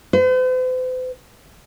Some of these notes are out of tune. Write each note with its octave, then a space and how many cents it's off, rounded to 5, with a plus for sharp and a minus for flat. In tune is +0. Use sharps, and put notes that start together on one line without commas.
C5 -45